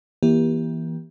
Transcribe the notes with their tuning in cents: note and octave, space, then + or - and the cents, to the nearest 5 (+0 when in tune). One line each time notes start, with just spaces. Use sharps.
E3 +0 A#3 +35 G4 +0